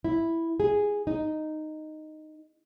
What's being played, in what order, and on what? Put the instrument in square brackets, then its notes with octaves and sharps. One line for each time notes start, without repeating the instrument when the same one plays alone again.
[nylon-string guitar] E4
G#4
D#4